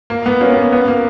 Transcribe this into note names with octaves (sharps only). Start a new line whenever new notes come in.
A#3
B3
A#3 C#4
B3
A#3
B3
A#3